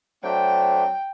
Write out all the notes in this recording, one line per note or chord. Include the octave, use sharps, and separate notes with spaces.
F#3 A3 C4 D4 G5